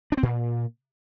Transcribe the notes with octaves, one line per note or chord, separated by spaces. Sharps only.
D4
C4
A#2